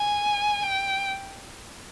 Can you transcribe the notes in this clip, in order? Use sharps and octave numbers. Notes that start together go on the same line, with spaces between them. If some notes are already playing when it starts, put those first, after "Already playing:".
Already playing: G#5
G5